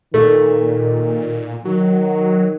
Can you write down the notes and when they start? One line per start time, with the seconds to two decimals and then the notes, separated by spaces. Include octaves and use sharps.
0.14 A#2 D#3 A3
1.65 D#3 F#3